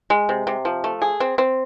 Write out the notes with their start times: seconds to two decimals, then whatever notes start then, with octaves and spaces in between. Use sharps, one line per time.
0.10 G#3
0.29 C3
0.47 C3
0.65 F3
0.84 A3
1.02 G#4
1.20 C4
1.38 C4